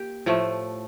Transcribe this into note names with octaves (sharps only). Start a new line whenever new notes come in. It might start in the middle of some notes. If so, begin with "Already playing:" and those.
Already playing: A#3 G4
A2 F3 A3